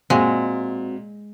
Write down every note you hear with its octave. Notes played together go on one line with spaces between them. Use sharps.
A#2 G#3 C4 F#4